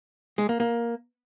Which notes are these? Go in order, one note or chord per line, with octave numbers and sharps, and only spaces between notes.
G#3
A#3
A#3